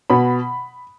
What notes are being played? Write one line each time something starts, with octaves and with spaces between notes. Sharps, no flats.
B2 B5